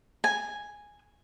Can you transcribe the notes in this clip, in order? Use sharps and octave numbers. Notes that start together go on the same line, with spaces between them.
G#5